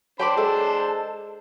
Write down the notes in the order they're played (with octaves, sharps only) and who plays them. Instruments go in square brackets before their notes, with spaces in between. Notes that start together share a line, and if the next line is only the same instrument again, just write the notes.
[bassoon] F#3 [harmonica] D4 C5 C6 [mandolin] G5 B5 D6 [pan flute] A5
[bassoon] G#3 [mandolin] A4